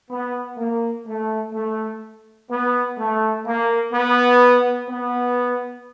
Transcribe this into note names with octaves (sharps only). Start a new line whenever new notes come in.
B3
A#3
A3
A3
B3
A3
A#3
B3
B3